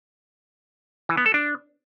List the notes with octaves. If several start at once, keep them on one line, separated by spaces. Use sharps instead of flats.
E3
B3
A4
D4